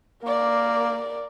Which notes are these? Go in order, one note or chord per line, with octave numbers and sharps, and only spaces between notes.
A#3 A#4 D5